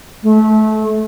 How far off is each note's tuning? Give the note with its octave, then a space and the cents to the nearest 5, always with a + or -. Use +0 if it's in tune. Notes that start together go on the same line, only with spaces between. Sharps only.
A3 -25